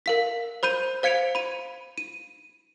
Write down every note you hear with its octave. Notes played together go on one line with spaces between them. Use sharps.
A#4 F5 B6
C5 B5 G6 D#7
C5 F5 G#6 C#7 D7 F7
B5 D#7
D#7